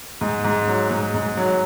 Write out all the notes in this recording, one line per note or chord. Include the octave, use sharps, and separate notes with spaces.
G#2
G#2
F#3
G#2
G#2
F#3